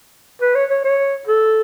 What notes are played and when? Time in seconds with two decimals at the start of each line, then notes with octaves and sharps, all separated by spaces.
0.42 B4
0.55 C#5
0.70 C#5
0.85 C#5
1.27 A4